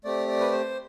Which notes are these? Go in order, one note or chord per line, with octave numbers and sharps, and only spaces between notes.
A3 C4 G4 D5
D5
B4
C5